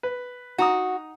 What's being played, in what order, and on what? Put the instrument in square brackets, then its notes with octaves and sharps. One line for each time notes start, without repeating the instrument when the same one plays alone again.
[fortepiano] B4
[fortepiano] D#4 A#5 D#6 [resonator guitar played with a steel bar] F#4